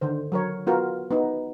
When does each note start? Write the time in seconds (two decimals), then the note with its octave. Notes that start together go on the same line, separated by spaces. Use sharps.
0.01 D3 D#3 C5
0.32 F#3 A#4 C#5
0.67 B3 F4 F#4 A#4
1.11 B3 D#4